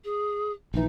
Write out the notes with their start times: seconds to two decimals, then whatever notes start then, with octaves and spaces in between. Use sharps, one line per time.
0.04 G#4
0.74 A#1 E3 D#4